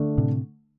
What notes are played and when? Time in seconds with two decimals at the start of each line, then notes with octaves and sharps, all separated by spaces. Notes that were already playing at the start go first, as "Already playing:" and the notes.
Already playing: D3 A3 D4
0.18 A2 C3